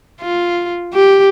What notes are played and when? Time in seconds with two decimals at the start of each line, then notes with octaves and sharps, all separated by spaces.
0.21 F4
0.94 G4